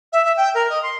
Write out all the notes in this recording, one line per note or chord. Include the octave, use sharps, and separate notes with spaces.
E5
E5
G5
A#4
D#5
C6